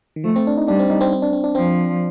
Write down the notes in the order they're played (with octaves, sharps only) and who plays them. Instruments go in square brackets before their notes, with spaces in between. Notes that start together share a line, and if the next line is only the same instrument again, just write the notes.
[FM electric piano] D#3
[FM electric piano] F3 [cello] A3
[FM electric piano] C4
D4
D#4
[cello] G3 [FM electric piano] D4
[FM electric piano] C4
D#4
C4
C4
D4
C4
D4
[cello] F3 [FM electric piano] C4